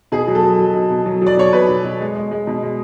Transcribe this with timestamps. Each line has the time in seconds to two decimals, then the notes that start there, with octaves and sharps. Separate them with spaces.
0.12 B2 G#4
0.28 F#3
0.35 A4
0.43 F#3
0.59 F#3
0.74 B2
0.90 B2
1.06 F#3
1.22 F#3 D5
1.37 B2 C#5
1.53 B2 B4
1.68 B2
1.84 B2
2.00 G#3
2.16 G#3
2.31 G#3
2.47 B2
2.63 G#3